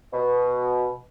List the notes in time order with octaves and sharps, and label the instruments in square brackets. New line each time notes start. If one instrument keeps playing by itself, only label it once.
[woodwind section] B2